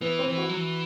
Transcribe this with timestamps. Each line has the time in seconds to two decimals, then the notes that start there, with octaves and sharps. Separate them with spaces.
0.01 E3 B3
0.19 C4
0.28 E3
0.38 F#4
0.49 F#3
0.56 E3